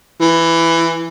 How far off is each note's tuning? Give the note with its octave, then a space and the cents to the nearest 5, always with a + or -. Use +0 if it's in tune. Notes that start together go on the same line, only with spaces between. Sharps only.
E3 +10